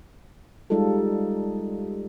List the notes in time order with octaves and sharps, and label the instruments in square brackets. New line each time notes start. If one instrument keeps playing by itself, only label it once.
[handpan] G3 G#3 D#4 F4 A4